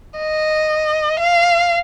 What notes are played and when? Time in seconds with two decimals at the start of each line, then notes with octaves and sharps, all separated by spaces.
0.19 D#5
1.19 F5